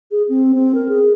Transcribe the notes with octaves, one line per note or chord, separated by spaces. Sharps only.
G#4
C4
C4
A#4
G#4